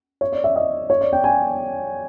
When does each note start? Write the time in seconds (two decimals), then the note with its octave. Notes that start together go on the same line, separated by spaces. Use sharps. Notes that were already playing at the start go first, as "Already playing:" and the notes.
0.21 C#5
0.32 D5
0.44 E5
0.56 D#5
0.90 C#5
1.01 D5
1.13 G5
1.24 G#5